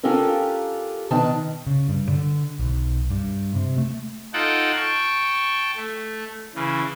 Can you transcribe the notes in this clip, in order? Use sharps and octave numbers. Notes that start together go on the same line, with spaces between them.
C#4 D4 F4 G4 A4 A#4
B2 D#3 D4 A5
C#3
G2
D3
B1
G2
C3
A3
D#4 F4 A4 F#5 G5 A5
G5 A5 C#6
A3
C#3 E3